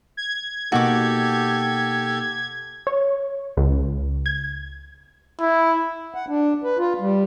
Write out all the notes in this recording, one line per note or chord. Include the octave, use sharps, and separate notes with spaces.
G#6
B2 A#3 D#4 F#4 G4 A4 D6
C#5
C#2
G#6
E4
F#5
D4
B4
F4
G3